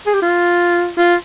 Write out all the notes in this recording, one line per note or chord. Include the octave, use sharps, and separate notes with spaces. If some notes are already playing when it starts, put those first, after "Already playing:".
G#4
G4
F4
F4